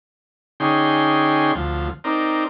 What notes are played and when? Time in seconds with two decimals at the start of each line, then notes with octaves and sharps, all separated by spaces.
0.60 D3 C#4 D#4 G#4 G5 C6
1.55 D2 F3
2.04 C4 D#4 A#4 D5